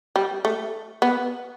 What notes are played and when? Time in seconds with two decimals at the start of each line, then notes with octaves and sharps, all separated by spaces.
0.16 G3
0.45 A3
1.02 B3